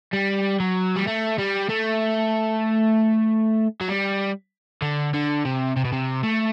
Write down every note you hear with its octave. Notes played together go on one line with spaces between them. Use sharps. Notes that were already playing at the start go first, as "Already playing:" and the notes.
G3
F#3
G3
A3
G3
A3
F#3
G3
D3
D3
C3
C3
B2
C3
A3